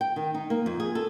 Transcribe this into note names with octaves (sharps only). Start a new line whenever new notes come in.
G5
D#3
D#4
A#3
F2
G#4
A4